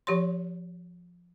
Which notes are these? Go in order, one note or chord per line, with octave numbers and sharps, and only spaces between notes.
F3 G4 C#5 C6